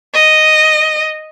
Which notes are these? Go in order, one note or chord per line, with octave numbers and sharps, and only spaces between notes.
D#5